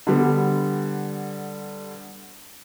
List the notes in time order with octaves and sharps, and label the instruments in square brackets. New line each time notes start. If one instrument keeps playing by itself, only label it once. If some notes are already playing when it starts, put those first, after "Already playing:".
[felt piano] D3 G3 B3